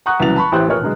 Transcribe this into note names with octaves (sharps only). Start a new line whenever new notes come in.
F#5 A#5 C#6 D#6 F#6
C2 C#3 E3 F#3 A6 F7
A5 B5 C#6
A1 E4 G4 C5 F#6
F1 E3 F3 A#4 C#5 F6
B2 D3 F#3 G#3